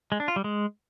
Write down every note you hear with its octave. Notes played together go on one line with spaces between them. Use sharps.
G#3
D4
F4
G3
G#3